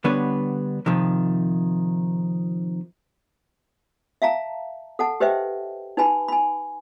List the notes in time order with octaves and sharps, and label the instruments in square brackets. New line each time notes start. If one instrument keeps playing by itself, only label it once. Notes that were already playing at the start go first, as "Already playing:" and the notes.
[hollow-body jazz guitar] D3 G3 B3 D4 B4 C#5
C3 D#3 F3
[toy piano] E5 F5 A5 A#5
A4 F#5 A5
G4 B4 C5 D#5 E5 G5
D#4 B4 G#5 B5
G#5 B5